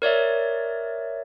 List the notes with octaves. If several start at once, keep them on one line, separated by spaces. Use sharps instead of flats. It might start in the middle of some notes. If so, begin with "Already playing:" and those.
A#4 C#5 D5 E5